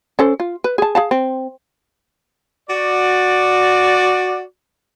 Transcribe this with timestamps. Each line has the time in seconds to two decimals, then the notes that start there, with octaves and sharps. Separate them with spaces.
0.19 C#4 A4 C5
0.40 F4
0.64 B4
0.78 G#4 A5
0.95 G#4 F5 A5
1.11 C4
2.70 F#4 D5